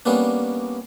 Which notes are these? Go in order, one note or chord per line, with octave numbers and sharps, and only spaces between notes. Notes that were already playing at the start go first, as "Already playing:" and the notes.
G3 A#3 B3 C#4 D4